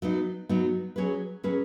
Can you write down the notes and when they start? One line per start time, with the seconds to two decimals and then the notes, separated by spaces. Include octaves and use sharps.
0.02 F#3 B3 D#4
0.49 F#3 B3 D#4
0.96 F#3 C#4 G#4 B4
1.43 F#3 C#4 G#4 B4